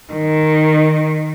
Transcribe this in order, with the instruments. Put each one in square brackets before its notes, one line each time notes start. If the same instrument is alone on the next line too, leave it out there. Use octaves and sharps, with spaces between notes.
[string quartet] D#3